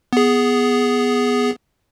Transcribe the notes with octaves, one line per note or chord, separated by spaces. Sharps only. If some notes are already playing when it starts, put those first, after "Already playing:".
B3 G#4